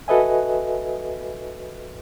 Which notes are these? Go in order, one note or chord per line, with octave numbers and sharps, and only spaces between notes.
F#4 A4 B4 D#5 E5 G#5